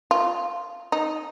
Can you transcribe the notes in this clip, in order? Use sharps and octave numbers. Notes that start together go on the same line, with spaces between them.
F4
D#4